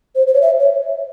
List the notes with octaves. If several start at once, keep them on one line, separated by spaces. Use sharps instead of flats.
C5
C5
C#5
E5
C#5